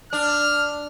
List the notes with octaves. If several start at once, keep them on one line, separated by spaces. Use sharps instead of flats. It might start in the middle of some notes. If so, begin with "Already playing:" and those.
D4 F6